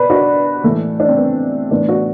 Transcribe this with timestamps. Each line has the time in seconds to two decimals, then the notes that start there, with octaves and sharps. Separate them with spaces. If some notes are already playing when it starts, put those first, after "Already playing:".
Already playing: B2 B4 D5
0.10 D4 F#4
0.64 A2 E3 A3
1.00 D4
1.08 C4
1.17 B3
1.71 A2 E3 B3 D4
1.89 D4 F#4